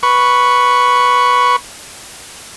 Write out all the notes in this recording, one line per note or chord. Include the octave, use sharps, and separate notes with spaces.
B4 C#6